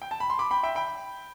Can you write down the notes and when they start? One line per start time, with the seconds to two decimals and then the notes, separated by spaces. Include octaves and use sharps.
0.02 G5
0.11 A5
0.20 B5
0.30 C6
0.39 B5 D6
0.51 G5 B5
0.63 E5 G5
0.75 G5 B5